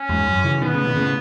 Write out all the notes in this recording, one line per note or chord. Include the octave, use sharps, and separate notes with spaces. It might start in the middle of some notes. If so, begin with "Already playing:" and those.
Already playing: C#4
E2 G#2
F#2
C#3 E3
B2 D#3 B3
A2 C#3
B2 D#3
A2 C#3